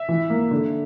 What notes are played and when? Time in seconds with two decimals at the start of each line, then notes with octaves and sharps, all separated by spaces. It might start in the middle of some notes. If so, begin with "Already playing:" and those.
Already playing: E5
0.09 E3
0.30 A#3
0.51 D3